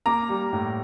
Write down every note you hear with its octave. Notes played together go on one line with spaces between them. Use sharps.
A#3 A#5 D6
G3
A2